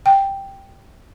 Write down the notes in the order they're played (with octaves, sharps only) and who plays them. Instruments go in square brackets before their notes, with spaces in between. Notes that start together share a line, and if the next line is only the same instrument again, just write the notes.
[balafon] G5